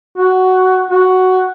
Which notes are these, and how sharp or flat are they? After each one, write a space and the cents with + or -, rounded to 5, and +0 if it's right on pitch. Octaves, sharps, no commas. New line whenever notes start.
F#4 +10
F#4 +5